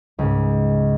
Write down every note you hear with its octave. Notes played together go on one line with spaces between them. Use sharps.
C#2 G#2